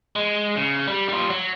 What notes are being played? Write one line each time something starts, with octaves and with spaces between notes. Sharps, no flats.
G#3
C#3
G3
G3 F4
F#3